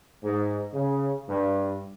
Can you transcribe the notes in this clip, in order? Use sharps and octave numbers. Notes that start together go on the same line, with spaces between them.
G#2
C#3
G2